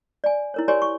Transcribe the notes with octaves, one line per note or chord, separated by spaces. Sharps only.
D5 G#5
E4 A#4 C#5
G4 A#4 C#5 D5 G#5 C6
C#6